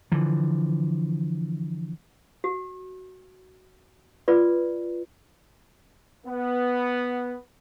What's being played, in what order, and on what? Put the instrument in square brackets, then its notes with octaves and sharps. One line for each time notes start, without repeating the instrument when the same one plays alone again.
[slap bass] D3 E3 F3
[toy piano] F#4
F4 B4 D5
[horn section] B3